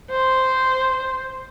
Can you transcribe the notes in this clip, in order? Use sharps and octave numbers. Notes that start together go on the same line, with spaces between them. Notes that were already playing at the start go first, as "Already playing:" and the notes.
C5